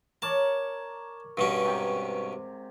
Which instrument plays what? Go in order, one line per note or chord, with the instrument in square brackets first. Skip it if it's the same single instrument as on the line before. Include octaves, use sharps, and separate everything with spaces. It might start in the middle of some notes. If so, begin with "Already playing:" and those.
[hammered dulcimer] A#4 C#5 D5 [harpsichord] A5
[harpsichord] G2 B2 C#4
[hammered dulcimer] G#2 C3 G4